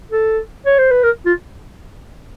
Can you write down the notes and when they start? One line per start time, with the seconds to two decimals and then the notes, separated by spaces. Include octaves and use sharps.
0.12 A4
0.66 C#5
0.78 C5
0.91 B4
1.03 A#4
1.26 F4